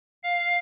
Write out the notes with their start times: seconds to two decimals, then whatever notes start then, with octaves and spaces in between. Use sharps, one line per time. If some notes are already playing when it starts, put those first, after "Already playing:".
0.23 F5